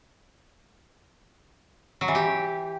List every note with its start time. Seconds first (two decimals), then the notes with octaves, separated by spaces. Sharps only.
2.01 F#3
2.08 E3
2.15 G4